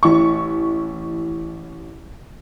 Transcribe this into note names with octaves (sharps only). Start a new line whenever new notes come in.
A1 E4 C#6